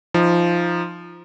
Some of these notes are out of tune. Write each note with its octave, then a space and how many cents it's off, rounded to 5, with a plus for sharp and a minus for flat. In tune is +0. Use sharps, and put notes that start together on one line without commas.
F3 -10 D#4 +10